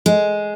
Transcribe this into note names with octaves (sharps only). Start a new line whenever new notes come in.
G#3